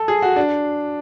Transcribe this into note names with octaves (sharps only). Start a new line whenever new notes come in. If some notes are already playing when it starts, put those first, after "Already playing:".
Already playing: A4
G#4
F#4
D4